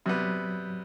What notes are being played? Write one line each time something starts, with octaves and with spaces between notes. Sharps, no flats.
C3 F#3 G3 B3